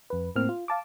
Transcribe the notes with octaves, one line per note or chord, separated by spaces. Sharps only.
F2 B4
A2 A#3 C4 F6
F4
F5 A5 D6